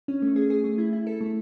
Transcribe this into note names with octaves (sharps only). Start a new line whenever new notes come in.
C#4
A3
G#4
G#4
A3
E4
E4
A4
A3